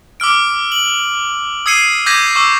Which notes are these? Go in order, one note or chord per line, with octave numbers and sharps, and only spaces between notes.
D6 E6 F6 D7
F#7
D#6 E6 G#6 C7 C#7 D#7
D6 G6 G#6 A#6 B6 D#7
C#6 D6 E6